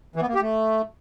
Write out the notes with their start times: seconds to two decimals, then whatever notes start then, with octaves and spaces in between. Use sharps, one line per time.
0.16 E3
0.22 B3
0.28 A#3
0.34 G4
0.41 A3